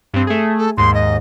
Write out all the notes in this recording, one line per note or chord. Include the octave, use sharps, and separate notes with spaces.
G2 C4
A3 G#4
A4
D#2 G#2 C6
D#5